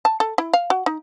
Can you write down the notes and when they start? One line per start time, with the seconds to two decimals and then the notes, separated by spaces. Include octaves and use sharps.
0.05 A5
0.20 A4
0.38 E4
0.53 F5
0.70 F#4
0.86 D#4